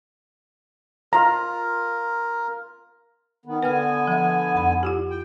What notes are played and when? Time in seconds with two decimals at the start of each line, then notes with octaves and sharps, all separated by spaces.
1.13 F4 A#4 F5 A#5
3.45 D#3 B3
3.63 D3 B3 B4 G5 G#5 F6
4.07 F3 E5
4.55 F2 B5
4.83 E4 F4 G4
5.10 G5